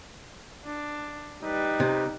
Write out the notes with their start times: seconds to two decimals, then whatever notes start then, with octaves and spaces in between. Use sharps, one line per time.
0.65 D4
1.43 G3 D#4 B4
1.80 C3